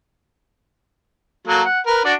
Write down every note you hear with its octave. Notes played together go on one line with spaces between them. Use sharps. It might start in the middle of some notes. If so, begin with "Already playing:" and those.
F#3 A#3 A4
F#5
A#4 B4
D4 F#4 D5